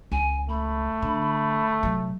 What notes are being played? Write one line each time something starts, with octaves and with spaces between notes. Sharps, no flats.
C#2 G#5
A3 B5
D3
C3 F#3